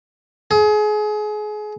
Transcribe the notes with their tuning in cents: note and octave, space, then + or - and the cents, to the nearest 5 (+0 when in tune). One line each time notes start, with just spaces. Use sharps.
G#4 +30